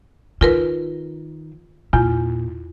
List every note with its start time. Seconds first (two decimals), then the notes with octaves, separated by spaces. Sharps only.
0.41 D#3 F4 A#4 B4
1.93 E2 A#2 F4